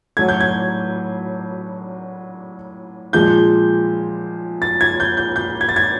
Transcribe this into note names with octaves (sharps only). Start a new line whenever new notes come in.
A2 F#3 A3 G#6
G6
G#6
A#2 F3 G#3 G6
A6
G#6
G6
G6
G6
G#6
A6
G#6